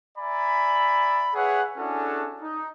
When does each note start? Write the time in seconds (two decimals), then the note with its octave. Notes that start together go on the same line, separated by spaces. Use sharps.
0.18 D5 E5 G#5 A#5 B5
1.34 G#4 B4 C#5 E5 F#5
1.77 C#4 D4 E4 F#4 G#4 A4
2.42 D#4